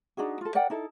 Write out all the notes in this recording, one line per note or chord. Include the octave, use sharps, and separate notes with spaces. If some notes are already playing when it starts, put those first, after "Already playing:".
D4 D#4 F#4 G#4
F4 A4
A#4 D5 F#5 G5
D#4 E4 A4